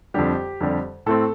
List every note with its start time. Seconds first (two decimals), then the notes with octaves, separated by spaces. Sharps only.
0.14 F2 D3 G3 G4
0.61 F2 D3 G3
1.06 A2 A3 C4 A4